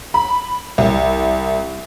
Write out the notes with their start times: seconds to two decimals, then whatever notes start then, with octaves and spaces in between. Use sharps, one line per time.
0.14 B5
0.78 C2